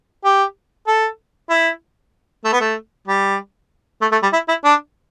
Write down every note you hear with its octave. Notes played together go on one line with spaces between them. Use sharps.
G4
A4
E4
A3
B3
A3
G3
A3
A3
G3
E4
E4
D4